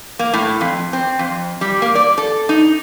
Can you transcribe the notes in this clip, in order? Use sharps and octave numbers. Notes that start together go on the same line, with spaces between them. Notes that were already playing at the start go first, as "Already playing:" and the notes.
A#3
A2
F2
C4
F2
G3
A#3
D5
A4
D#4